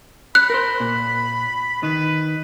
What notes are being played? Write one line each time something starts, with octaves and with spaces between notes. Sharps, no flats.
B5 F#6
A#4 C5
A#2
D#3 B4